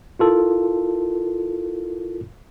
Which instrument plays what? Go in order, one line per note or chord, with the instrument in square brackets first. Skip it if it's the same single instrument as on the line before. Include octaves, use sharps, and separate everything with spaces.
[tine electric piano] E4 F4 A4 A#4